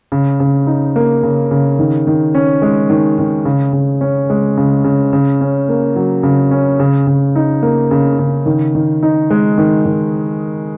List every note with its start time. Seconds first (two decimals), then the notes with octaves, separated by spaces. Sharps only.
0.12 C#3
0.40 C#3
0.67 D#4
0.96 A#3
1.23 C#3
1.51 C#3
1.79 D#3
2.07 D#3
2.35 C#4
2.62 G#3
2.90 D#3
3.18 D#3
3.45 C#3
3.73 C#3
4.01 C#4
4.30 G#3
4.57 C#3
4.84 C#3
5.13 C#3
5.41 C#4
5.69 A#3
5.96 F#3
6.23 C#3
6.51 C#4
6.80 C#3
7.07 C#3
7.36 D#4
7.62 A#3
7.91 C#3
8.19 C#3
8.46 D#3
8.75 D#3
9.03 D#4
9.30 G#3
9.58 D#3
9.85 D#3